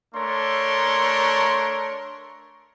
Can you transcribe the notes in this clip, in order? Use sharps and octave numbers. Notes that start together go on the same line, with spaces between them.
A3 D4 A#4 C#5 C6